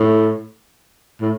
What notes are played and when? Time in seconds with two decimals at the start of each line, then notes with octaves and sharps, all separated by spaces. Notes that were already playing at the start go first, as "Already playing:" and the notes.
Already playing: A2
1.21 A2